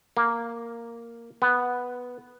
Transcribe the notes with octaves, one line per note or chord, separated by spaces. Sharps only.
A#3
B3